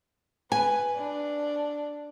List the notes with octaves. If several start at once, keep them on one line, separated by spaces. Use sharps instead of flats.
B4 G#5
D4